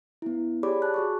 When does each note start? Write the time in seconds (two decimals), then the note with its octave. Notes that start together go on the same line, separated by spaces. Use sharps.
0.22 B3 E4
0.63 G4 G#4 C#5 D5 B5 D6
0.82 A5 F#6
0.94 F#4 G#4 C#6